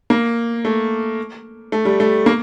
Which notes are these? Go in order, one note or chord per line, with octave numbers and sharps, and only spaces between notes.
A#3
A3
A3
G3
A3
A#3